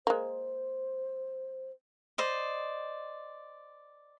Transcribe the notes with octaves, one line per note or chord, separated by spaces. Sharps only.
G#3 A#3 C5
C5 D5 D#5